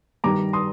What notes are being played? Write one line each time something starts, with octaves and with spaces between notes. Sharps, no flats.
G2 D#3 G3 A#5 D6
C6 D#6